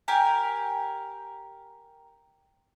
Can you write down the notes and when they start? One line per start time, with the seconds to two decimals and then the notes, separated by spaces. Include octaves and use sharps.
0.08 G4 A#4 G#5